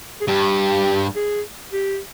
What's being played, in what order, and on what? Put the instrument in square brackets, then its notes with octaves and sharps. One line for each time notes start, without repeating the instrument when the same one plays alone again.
[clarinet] G#4
[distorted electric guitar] G2 [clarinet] G4
[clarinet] G#4
G4